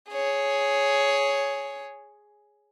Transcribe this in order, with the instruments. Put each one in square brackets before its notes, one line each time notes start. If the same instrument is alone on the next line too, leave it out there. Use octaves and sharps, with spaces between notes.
[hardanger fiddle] G#4 C#5